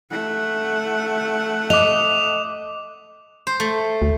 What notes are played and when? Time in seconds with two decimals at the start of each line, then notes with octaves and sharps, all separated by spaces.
0.10 A3 F#5
1.70 D#5 D6 F7
3.47 C5
3.60 A3
4.02 D2